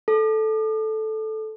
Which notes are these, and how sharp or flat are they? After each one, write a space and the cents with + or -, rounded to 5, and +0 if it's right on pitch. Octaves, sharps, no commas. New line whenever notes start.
A4 -10